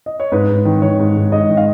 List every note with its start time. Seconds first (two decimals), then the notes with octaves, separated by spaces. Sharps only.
0.06 D#5
0.20 C#5
0.32 G#2 B4
0.49 G#2
0.65 D#3
0.82 D#3 C#5
1.00 G#2
1.16 G#2
1.32 G#2 D#5
1.49 D#3
1.57 F5